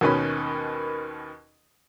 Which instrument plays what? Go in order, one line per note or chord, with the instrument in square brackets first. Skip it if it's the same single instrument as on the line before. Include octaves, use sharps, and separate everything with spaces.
[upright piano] D#2 B2 D#3 C#4 B4 B5